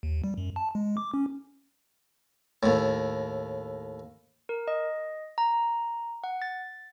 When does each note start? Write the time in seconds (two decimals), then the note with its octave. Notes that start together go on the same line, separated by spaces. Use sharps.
0.03 D#2
0.24 G3
0.38 F#2
0.56 A5
0.75 G#3
0.97 D6
1.14 C#4
2.63 D#2 A2
4.49 A#4
4.68 D#5
5.38 A#5
6.24 F#5
6.42 A6